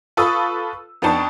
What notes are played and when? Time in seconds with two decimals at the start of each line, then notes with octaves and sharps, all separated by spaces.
0.17 F4 A4 B4 C#6 D#6 E6
1.02 F2 B3 D4 D#4 A5 C#6